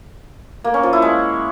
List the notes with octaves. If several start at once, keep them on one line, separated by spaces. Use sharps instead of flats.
A#3
C#4
F3
E4
G#3